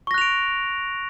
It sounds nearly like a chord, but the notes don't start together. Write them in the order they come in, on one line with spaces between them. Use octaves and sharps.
C#6 A#6 F#6 F7 D7